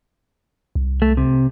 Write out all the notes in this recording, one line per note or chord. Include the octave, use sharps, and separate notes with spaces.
C2
A3
C3